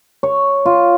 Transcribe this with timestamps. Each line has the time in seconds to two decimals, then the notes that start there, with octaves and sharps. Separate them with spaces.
0.23 C#5
0.66 F4